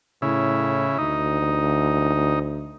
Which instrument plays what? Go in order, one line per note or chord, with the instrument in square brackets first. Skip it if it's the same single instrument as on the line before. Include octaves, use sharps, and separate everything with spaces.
[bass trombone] A2 [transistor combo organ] C#3 E4
[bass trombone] D2 [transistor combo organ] D#4